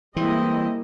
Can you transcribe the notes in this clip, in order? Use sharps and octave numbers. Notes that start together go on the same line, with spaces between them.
E3 G3 G#3 A#3 C4 E4 D#5